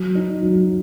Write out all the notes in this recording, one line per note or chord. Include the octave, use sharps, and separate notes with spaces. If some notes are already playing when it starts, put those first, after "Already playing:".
Already playing: F#3
D#4
F#3